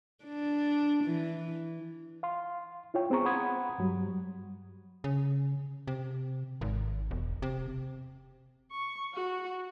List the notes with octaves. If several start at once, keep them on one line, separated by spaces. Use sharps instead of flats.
D4
E3
F5 C6
E4 F4 C#5 G5
B3 C4 G#4 A#5 C#6
F#5 B5 C6 D#6 G#6
G2 F#3 G3
C#3
C3
G#1
E1
C3
C#6
F#4